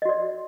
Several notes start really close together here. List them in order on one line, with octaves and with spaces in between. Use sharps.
D#5 F#4 D5